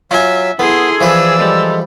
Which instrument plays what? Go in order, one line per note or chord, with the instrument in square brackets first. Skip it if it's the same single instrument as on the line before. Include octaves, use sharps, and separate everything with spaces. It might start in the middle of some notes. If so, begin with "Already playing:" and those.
[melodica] F#3 [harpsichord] F4 G#5 [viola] E5
[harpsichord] B3 [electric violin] E4 C6 [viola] G#4 [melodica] A4 D#6
[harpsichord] E3 F3 B4 [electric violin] D5 E6
[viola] G3 [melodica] G#3 A4